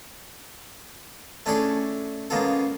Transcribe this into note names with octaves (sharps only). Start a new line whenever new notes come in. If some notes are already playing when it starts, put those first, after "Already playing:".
A3 C#4 D4 E4 G#4 A4
C#3 G#3 A#3 B3 F4 A4